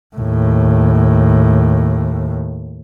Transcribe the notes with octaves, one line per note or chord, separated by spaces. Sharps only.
D#2 A2